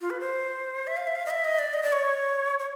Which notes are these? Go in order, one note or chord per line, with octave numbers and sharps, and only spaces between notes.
F4
B4
C5
E5
F5
E5
F5
D#5
E5
D#5
D5
D#5
D5
C#5
C#5